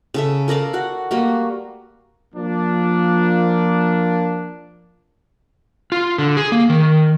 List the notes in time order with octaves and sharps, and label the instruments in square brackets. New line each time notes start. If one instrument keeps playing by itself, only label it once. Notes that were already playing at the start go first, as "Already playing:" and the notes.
[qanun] C#3 A4 E5
A4 A#4 D5 F5
F#4 F#5
G3 A3 A#3 F#4
[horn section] F3 A#3 D4
[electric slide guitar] F4
D3
G#4
A#3
D#3